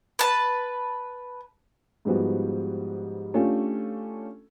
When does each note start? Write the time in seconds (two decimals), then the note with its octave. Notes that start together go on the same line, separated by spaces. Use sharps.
0.19 B4 A5
2.05 G#2 F3 G3 B3 F#4
3.34 A3 C#4 D4 F4 G4 A4